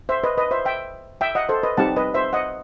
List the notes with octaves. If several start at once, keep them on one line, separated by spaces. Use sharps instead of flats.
C5 E5
B4 D#5
B4 D#5
C5 E5
E5 G5
E5 G5
D#5 F#5
A4 C5
B4 D#5
G3 C4 D#4 G4 F#5 A5
B4 D#5
C5 E5
D#5 F#5